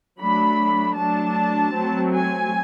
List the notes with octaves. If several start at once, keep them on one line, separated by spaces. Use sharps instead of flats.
F#3 A3 D4 B5
F#3 A3 D4 A5
F#3 A3 C4
G#5